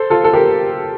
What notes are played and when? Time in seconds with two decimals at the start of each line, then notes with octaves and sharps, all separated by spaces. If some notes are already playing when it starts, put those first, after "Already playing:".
Already playing: A4 C5
0.10 F4 A4
0.24 A4
0.33 G4 A#4